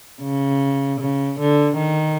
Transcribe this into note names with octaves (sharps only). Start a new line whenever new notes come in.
C#3
C#3
D3
D#3